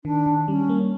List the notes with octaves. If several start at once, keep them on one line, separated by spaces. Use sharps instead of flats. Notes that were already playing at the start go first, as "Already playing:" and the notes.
D#3 D4
D#3
G3 C#4
A#3